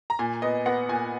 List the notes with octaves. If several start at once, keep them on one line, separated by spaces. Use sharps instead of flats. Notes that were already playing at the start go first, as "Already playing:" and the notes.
A#5
A#2 G#5
B3 D#5
B3 F#5
A#2 G#5